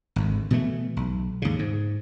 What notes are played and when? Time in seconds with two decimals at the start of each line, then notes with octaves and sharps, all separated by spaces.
0.16 G#1 D2
0.50 B2 E3 A3
0.97 B1
1.42 D#2 G#2 C#3
1.59 G#2